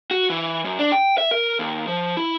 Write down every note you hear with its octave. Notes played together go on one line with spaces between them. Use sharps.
F#4
E3
F#2
D4
G5
E5
A#4
D#2
F3
E4